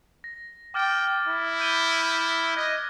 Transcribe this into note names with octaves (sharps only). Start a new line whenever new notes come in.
A#6
G5 D6 F6 A6
E4
G6 D#7 G7
D#5 F#6 G#6 A#6